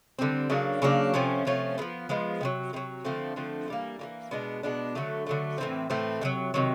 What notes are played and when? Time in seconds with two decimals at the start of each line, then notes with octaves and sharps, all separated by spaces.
0.19 D3 G3 C4
0.50 C#3 F#3 A#3 D4
0.82 C#3 F#3 A#3 D4
1.14 C3 F3 A3 C#4
1.45 C3 F3 A3 C#4
1.78 G#3 B3
1.82 F3
2.09 F3 G#3 B3
2.41 C3 D#3 F#3
2.73 C3 D#3
2.76 F#3
3.05 D3 F3 A3 C4
3.36 D3 F3 A3 C4
3.68 E3 G3 A#3
3.99 E3 G3 A#3
4.31 B2 G#3 B3 D4
4.63 B2 G#3 B3 D4
4.95 D3 F#3 A3
5.27 D3 F#3 A3
5.58 A2 E3 A3 C4
5.90 A2 E3 A3 C4
6.21 C3 D#3 F#3
6.54 C3 D#3 F#3